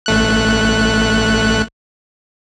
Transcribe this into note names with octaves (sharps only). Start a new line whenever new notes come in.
A1 A3 F#6